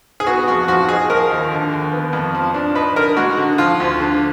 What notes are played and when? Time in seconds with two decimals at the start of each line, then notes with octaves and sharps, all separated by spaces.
0.20 G#4
0.26 B3 F#4
0.48 F2 F#4
0.68 F3 F#4
0.89 D#4 G#4
1.09 F3 A#4
1.30 D#2
1.51 D3
1.72 D#2
1.93 B3
2.13 F2
2.35 F3
2.54 D4
2.75 D#4 B4
2.96 D3 A#4
3.17 G#3 F#4
3.37 D3
3.58 F3 F4
3.80 D2
4.00 D3